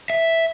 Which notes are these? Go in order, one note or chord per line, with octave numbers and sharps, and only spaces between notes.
E5